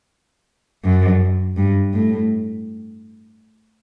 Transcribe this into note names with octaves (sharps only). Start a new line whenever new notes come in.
F#2
G2
A2